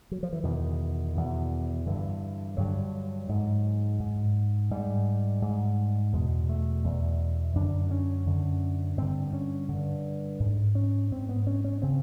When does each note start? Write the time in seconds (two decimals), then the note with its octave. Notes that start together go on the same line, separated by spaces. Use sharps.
0.11 F#3
0.23 F3
0.33 E3
0.43 E2 B2 D#3
1.15 E2 B2
1.86 G2 D3 E3
2.57 G2 D3 F#3
3.29 G#2
4.00 G#2
4.71 G#2 G3
5.42 G#2
6.13 E2 B2 G#3
6.49 A3
6.84 E2 B2
7.56 F#2 D3 D4
7.91 C#4
8.26 F#2 D3
8.97 G2 D3 C4
9.33 C#4
9.69 G2 D3
10.40 G#2
10.75 C#4
11.11 G#2 C4
11.29 B3
11.47 C#4
11.64 C#4
11.82 C#3 C4